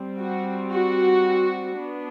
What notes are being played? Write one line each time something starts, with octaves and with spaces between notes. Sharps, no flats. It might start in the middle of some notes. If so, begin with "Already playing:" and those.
Already playing: G3 C4
F#4
F#4
B3 D4